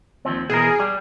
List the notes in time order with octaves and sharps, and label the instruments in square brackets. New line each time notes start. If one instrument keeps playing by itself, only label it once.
[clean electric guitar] D#2 F3 C4
[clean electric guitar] B2 E3 A#4 [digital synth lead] G#4
[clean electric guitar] G3